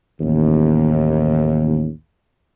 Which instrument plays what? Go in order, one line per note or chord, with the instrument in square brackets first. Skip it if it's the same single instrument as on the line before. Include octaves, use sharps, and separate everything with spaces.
[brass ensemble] A1 D#2